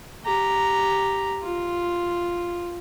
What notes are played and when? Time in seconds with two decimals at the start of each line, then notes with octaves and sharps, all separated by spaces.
0.24 G4 A#5
1.42 F4